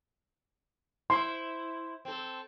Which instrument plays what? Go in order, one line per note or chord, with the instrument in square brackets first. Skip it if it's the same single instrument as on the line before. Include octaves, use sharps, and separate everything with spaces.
[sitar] E4 C5 [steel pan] C6
[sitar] C4 A4